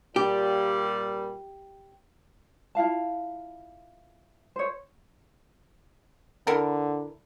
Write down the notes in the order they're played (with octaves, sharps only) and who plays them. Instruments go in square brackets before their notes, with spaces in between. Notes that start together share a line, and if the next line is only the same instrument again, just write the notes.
[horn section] A#2 G3 [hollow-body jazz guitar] G4
[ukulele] E4 F4 F5 A5
C5 C#5
[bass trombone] D3 [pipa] E4 A4 A#4